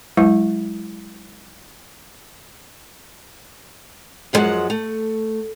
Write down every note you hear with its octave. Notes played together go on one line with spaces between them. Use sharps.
F#3 G#3 E4
F#2 B2 F3 F#3 G#3 F#5
A3